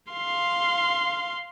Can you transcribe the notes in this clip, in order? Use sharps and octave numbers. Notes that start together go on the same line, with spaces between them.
F5 C6